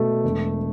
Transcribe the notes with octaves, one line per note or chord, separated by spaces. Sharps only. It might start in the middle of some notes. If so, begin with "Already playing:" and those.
Already playing: B2 A3
E1